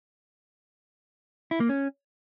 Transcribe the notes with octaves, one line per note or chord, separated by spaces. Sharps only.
E4
A#3
C#4